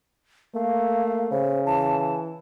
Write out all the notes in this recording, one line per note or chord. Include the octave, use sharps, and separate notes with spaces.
A3 A#3 F5
C#3 C5
E3 A5